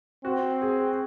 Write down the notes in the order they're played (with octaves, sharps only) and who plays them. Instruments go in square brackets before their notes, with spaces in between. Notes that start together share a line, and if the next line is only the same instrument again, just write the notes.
[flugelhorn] C4 [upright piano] F#4
[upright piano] G#4